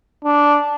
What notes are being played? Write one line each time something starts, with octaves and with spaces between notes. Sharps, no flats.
D4